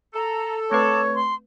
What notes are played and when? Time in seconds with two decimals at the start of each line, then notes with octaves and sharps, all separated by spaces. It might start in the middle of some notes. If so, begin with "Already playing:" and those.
0.14 A4 A#5
0.71 A3 C4 B4 C#5 A5 B5 D6
1.14 C6